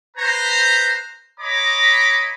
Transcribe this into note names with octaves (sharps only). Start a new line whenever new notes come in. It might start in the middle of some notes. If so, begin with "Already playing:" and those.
B4 C5 A#5
C#5 D#5 A#5 B5 D6